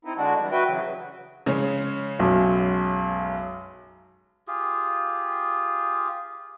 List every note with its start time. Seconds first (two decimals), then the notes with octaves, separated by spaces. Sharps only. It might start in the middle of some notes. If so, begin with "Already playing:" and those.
0.05 C4 D#4 E4
0.17 D3 G#3 D4 F#4
0.39 E3 G3
0.51 F#4 B4 E5 G5
0.67 C#3 E3 F#3
1.46 C#3 G#3 C#4
2.19 B1 F#2
4.47 F4 G4 G#4